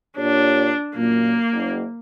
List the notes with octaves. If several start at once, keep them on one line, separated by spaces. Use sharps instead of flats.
A#2 D4 G4 C#5
F#2 A#2 A#3
F#1